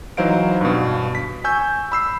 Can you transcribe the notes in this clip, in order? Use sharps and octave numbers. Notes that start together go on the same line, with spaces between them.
E3 F#3 D#4 C5 F5 D7
G2 B2
B6
G#5 C#6 E6 G6
B5 E6 C7